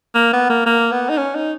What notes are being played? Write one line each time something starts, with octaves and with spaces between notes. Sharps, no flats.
A#3
B3
A#3
A#3
B3
D#4
C#4
D#4